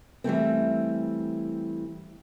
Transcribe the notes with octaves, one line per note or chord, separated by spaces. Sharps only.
E3 G3 A3 C4